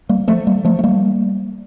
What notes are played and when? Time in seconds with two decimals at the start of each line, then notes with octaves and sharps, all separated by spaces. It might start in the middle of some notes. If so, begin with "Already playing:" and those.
0.09 G3 A#3
0.28 F3 A3
0.47 G3 A#3
0.65 F3 A3
0.79 A3
0.83 G3 A#3